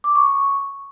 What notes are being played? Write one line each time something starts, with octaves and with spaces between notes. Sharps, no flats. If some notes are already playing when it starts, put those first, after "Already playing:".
D6
C#6
C#6